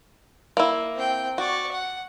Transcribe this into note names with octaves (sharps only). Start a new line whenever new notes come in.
A#3 E4
C4 G5
F#4 D5 C#6
F#5